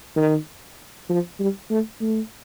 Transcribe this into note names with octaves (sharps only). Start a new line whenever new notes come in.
D#3
F3
G3
A3
A3